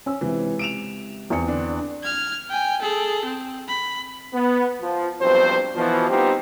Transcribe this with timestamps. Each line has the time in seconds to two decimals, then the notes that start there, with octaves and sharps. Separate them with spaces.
0.06 C#4 E6
0.21 C#2 C3 E3
0.59 D7 E7 F7
1.30 E2 C4 C#7
1.48 D3 D4
2.03 F6 G#6
2.50 G5 G#5
2.82 G#4 A4
3.25 C4
3.68 B5
4.33 B3
4.82 F3
5.21 B1 G2 F3 C4 C5
5.75 B2 E3 F3
6.09 G3 B3 C4 D#4 F4 G4